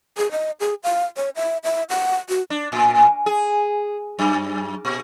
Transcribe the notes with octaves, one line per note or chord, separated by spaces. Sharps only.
G#4
D#5
G#4
F5
C#5
E5
E5
F#5
F#4
D4
A2
G#4
F#2
A#2